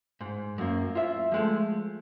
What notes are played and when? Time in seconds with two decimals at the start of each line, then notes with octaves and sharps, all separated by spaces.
0.21 G#2
0.58 F#2 A#3
0.95 F4 E5
1.32 F3 G#3 A3